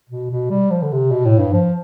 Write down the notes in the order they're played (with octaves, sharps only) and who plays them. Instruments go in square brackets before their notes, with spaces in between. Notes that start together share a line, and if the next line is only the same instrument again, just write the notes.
[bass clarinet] B2
B2
G3
F3
D3
C3
B2
A2
G2
F3